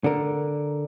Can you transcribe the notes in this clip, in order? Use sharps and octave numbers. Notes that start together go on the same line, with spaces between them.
D3 A#4